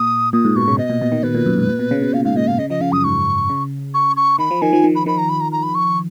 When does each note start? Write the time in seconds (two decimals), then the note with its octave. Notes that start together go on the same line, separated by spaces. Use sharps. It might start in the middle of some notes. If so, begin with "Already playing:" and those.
Already playing: A#2 D#6
0.33 A#2 D#6
0.45 G#2
0.56 B2 C#6
0.68 C#3
0.78 B2 D#5
0.90 A#2
1.02 B2
1.12 D#3
1.23 B2 B4
1.35 A#2
1.46 F#2
1.58 G#2
1.69 A#2
1.79 B2
1.91 C#3
2.02 B2
2.13 A#2 F5
2.25 G#2 F5
2.36 A#2 D#5
2.47 B2 F5
2.59 C#3 D#5
2.70 F3 D#5
2.81 C#3 F5
2.92 F#2 D#6
3.04 G#2 C#6
3.50 C#3
3.94 C#6
4.17 C#6
4.39 D#3 B5
4.51 F3
4.62 D#3 G#5
4.73 F3
4.84 D#3
4.95 B5
5.06 D#3 B5
5.18 A#5
5.29 B5
5.41 A#5
5.52 A#5
5.63 B5
5.75 C#6